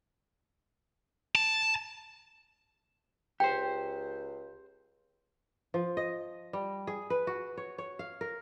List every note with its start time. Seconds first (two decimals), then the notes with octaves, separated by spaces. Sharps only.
1.35 A5
3.40 C#2 G4 C5 G5
5.74 F3
5.97 D#5
6.53 G3
6.87 G#4
7.10 B4
7.27 F#4
7.57 C#5
7.78 C#5
7.99 F5
8.21 A#4